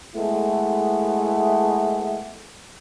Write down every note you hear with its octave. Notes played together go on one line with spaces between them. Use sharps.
G#3 A3 B3 E4